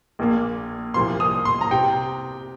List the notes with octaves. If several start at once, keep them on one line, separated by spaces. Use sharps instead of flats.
A#1 A#2 A#3
C2 A#2 F3 A#3 C6
D#6
C6
A#5
C3 G5